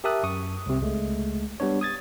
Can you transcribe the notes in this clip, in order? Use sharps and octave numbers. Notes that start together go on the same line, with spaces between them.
G4 A#4 E5 A5 D#6 F#6
F#2 C#6 D#6
C2 C3
C#2 G#3 A3
G3 B3 D4 C#5
D#6 G#6 A6